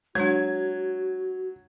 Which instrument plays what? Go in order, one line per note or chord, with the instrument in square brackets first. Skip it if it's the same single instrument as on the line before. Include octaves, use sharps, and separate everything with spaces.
[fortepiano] F#3 [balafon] G#3 D4 [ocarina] F#4 [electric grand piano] G#6